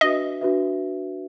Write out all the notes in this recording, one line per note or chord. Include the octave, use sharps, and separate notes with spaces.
D4 F#4 B4 D#5 E5
D4 F#4 B4 E5